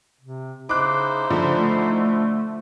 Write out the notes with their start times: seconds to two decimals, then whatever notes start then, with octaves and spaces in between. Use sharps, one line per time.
0.21 C3
0.69 C#3 D#4 E4 C5 D6 F#6
1.30 D3 F3
1.54 A3